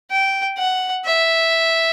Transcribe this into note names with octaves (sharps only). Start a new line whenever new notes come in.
G5
F#5
E5